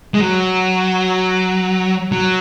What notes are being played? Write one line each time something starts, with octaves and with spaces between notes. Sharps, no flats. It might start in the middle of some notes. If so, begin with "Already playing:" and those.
G#3
F#3
F#3